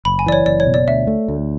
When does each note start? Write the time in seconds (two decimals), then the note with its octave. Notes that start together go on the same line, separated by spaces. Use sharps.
0.05 F#1 B5
0.19 G#5
0.26 E3 D5
0.32 C#5
0.46 F#1 D5
0.60 C#5
0.67 B2
0.74 D5
0.88 D2 E5
1.07 A3
1.28 D2